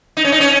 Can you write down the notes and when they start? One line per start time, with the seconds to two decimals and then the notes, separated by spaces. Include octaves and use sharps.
0.17 D#4
0.24 C#4
0.32 D#4
0.40 C#4